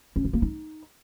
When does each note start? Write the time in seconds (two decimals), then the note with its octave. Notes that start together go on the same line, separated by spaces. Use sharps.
0.16 C#4
0.25 F4
0.33 A#3
0.42 D#4